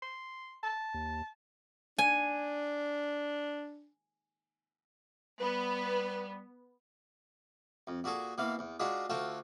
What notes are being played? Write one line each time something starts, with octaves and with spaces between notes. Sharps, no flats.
C6
A5
D#2
D4 G#5
G3 B3 B4
F2
A#2 F#4 G#4 A4
B2 E3 A#3 F5
E2
G#3 D4 F4 F#4 B5
D2 F4 F#4 A4 G5 A5